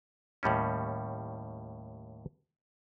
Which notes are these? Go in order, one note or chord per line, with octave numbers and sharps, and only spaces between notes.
D#2 A2 G3 C#4